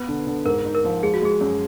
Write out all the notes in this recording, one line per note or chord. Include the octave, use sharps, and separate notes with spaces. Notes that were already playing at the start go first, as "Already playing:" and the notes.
Already playing: B3 B4
D3
D3
G#2 A#4
D#4
A#4
F3
G#3 G#4
F#4
G#3 G#4
F#2